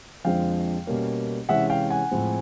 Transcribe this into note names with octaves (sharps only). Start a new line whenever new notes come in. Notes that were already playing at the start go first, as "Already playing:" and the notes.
F2 D3 F3 G#3 C4 F5 G5
B2 G3 A#3 C#4
C3 E3 G#3 C#4 E5 F#5
F5 G5
F#5 G#5
A2 F3 G#3 C4